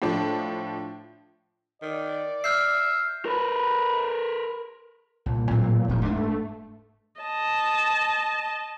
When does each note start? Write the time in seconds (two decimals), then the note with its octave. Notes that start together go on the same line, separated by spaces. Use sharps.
0.02 A2 F3 D4
1.82 D#3 D5
2.44 E5 F6 G6 C7
3.26 A#4 B4
5.26 C2 A#2
5.51 A2 F#3 C4
5.88 F1 D#2 A#2 D#3
6.02 G#2 D4
6.13 A3
7.21 D#5 A5